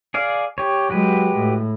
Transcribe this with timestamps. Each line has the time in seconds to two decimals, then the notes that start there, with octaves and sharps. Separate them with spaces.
0.14 G#4 D5 F5
0.58 G4 C#5
0.90 F#3 G#3 F#4 G4 B4
1.37 A2